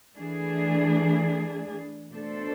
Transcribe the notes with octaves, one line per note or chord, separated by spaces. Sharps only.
E3 A3 D4 G#4
B2 A3 D4 A4 C5